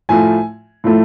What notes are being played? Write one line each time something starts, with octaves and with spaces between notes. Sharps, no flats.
A2 F3 A3 G#5
A2 F3 A3